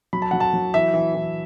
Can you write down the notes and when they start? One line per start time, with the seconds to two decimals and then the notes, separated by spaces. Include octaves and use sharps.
0.13 F#3 B5
0.22 A5
0.31 F#3 F#5
0.40 A5
0.54 F#3
0.74 E3 E5
0.94 E3
1.14 E3